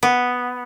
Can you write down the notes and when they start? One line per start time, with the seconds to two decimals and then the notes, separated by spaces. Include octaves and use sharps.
0.03 B3